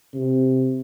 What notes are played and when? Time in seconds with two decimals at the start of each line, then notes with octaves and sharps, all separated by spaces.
0.14 C3